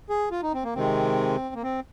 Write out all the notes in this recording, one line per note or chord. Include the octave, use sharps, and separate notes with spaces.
G#4
F4
D#4
C4
A#3
C3 D#3 G#3 C4
A#3
C4